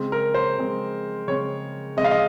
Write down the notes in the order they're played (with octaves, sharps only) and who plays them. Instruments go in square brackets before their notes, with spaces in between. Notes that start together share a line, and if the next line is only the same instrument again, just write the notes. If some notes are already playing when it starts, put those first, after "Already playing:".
Already playing: [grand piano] C#3 G#3 C4
A#4
C5
C#3 G#3 C4
C#3 G#3 C4 C#5
C#3 G#3 C4 D#5
F5
D#5